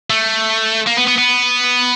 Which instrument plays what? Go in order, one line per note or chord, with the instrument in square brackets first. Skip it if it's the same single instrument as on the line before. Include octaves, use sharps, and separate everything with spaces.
[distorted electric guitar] A3
A#3
B3
B3
B3